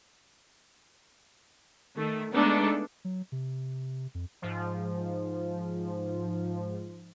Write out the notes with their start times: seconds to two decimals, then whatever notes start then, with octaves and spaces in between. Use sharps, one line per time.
1.97 D#3 A3
2.34 G#3 A3 B3 D4 D#4 A4
3.05 F#3
3.32 C3
4.15 F2
4.42 G#2 F3